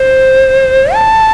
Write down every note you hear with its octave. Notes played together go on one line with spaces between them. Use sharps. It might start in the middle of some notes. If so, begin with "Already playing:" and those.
Already playing: C5
A5